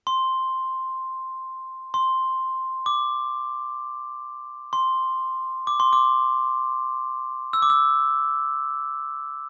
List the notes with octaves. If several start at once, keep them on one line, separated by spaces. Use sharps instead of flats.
C6
C6
D6
C6
D6
C6
D6
E6
D6
E6